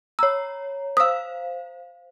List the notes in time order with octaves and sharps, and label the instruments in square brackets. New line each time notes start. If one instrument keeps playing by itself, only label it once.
[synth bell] C#5 A#5 [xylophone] E6
[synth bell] C5 F5 [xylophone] D#6 E6